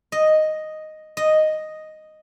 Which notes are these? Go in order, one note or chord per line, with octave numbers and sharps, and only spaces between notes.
D#5
D#5